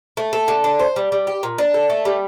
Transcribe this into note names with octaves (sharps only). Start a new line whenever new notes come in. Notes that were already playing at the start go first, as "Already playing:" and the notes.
A3
A4
D3
D4
C5
G3
G3
G4
A#2
D4
A4
A3
G3